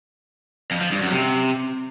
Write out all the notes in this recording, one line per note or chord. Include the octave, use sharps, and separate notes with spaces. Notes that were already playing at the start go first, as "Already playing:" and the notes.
F2
F3
G2
F#2
C3